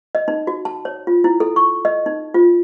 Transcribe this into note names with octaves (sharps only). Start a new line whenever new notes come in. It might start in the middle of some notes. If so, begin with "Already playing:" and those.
D#5
D#4
F#4
A5
C#5
F4
E4
A4
C#6
D#5
D#4
F4